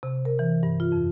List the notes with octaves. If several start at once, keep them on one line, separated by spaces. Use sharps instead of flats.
C3
A#4
E3
G2
F4
F2